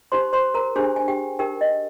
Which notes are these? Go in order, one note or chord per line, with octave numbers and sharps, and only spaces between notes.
D#4 G4 C5 C6
C5 C6
A#4 A#5
D4 G4 G#4 C5 G#5
G#5
G4 G5
D#4 G4 A#4 G5
D#5